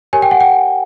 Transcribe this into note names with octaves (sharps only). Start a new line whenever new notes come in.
G4 A#4 C#5 G#5
G5
F#5
G5